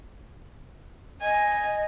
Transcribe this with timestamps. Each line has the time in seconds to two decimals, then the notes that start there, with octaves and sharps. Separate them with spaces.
1.22 D#5 G#5